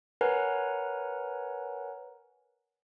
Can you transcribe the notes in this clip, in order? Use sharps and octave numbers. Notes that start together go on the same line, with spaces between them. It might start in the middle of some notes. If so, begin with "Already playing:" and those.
A#4 B4 C#5 F#5 G#5 A#5